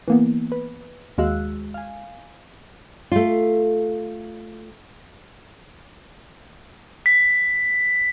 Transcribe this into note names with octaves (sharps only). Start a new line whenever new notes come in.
E3 A#3 B3
B4
D#2 G#3 F#4 F5 E6 F#6
F5 G#5
A3 F4
B6